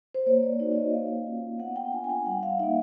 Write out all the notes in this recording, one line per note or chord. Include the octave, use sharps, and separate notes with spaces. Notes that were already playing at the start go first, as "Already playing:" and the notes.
C5
A#3 C#5
D5
D#4 F#4 D5
D5
D#5
A#3 F5
C#4 F4
B3 F#5
G5
D4 F4 G#5
G#5
G5
G3 F#5
F5
A#3 D#4 E5